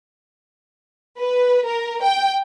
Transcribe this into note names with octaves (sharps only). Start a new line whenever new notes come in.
B4
A#4
G5